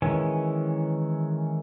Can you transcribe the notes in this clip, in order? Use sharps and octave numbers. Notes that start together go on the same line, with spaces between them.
D#3 E3 G#3 C#4